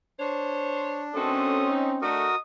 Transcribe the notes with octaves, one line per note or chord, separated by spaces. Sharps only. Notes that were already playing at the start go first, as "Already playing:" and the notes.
D4 C5 C#5
D#3 A3 C4 C#4 F#4 A4 C6 D#6
D#4
A3 D4 F#4 A#4 D#5 D#6